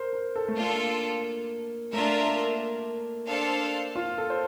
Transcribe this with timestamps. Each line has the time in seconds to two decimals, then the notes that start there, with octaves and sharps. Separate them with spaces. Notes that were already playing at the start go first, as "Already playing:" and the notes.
Already playing: A#4 C5
0.13 A#4
0.36 A4
0.48 A3
0.57 A#3 D4 F4 A4
1.93 A3 D4 F4 A#4 E5
2.27 A#3
3.28 D4 A4 C5 F5 A5
3.96 F4
4.18 A4
4.30 C5